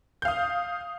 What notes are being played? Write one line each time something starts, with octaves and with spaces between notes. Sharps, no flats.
F5 D#6 G6